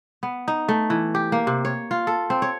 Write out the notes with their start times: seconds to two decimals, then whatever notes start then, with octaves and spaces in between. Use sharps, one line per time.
0.23 B3
0.48 D#4
0.68 A3
0.90 E3
1.15 G4
1.32 A#3
1.47 C3
1.65 C#5
1.91 F4
2.07 A4
2.30 C4
2.42 C#5